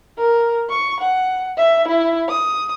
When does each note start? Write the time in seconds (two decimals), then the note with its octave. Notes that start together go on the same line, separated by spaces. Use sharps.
0.18 A#4
0.70 C#6
1.00 F#5
1.57 E5
1.88 E4
2.29 D#6